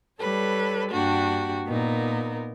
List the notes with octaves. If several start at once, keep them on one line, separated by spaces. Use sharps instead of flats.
G3 A4 B4 C#5
G2 A#3 D4 F#4 G4
A#2 B3 D#4 A#4